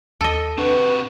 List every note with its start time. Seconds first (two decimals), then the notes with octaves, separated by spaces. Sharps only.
0.21 D#2 A4 D#5
0.58 C3 D4 F#4 B4